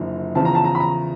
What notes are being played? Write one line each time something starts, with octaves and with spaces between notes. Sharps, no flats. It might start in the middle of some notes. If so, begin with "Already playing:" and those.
Already playing: F#1 F#2 D3 F3
E2 C#3 F3 A5
A#5
A5
A#5
B5
A#5